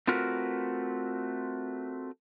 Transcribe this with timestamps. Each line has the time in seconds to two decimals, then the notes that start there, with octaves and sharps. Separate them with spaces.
0.08 A3 C4 F4 F#4 A#4 B4